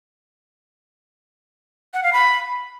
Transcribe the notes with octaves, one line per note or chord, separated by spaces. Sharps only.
F#5
F5
B5